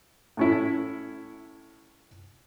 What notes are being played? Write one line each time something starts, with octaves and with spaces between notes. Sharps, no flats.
A2 C#4 E4